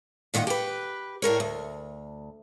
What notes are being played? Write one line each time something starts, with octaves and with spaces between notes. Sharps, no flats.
A#2 D#3 D#4 E4 F#5
G4 B4
A2 G3 A#4 C#5
D2